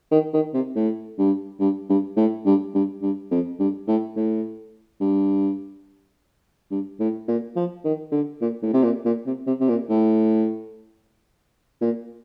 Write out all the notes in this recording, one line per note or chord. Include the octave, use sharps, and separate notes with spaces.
D#3
D#3
C3
A2
G2
G2
G2
A2
G2
G2
G2
F2
G2
A2
A2
G2
G2
A2
A#2
F3
D#3
D3
A#2
A2
C3
A#2
A#2
C3
C3
C3
A#2
A2
A#2